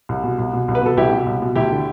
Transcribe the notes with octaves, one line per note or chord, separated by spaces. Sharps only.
C2
B2
C2
B2
C2
B4
B2 A4
C2 E4 G4
B2
C2
B2
D2 E4 G4
D3